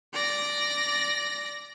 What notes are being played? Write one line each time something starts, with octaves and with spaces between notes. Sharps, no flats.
D5 A#6